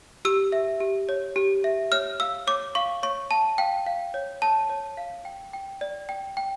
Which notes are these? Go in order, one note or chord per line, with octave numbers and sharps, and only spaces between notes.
G4 E6
E5
G4
C#5
G4
E5
C#5 F6
F5 E6
C#5 D6
F5 C#6
C#5 C#6
F5 A5
F5 G5
F5
C#5
C#5 A5
C#5
F5
G5
G5
D5
G5
G5